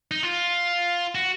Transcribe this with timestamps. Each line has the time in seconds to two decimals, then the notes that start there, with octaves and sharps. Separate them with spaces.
0.11 D#4
0.23 F4
1.15 F#4